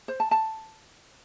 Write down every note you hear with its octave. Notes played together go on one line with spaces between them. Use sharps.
C5
A5
A5